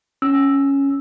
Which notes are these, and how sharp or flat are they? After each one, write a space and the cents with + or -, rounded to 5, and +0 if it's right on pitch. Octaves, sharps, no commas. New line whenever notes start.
C#4 +0 E6 +0